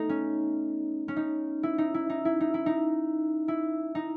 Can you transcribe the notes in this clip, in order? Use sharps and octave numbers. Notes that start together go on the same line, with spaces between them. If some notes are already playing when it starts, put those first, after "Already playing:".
Already playing: A3 B3 D#4
C#4
C#4
D#4
E4
D#4
E4
D#4
E4
D#4
E4
D#4
E4
D#4